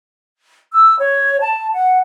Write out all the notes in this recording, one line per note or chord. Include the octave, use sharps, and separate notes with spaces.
E6
C#5
A5
F#5